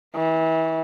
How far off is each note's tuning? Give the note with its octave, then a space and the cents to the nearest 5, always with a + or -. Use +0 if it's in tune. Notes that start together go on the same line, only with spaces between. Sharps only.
E3 -30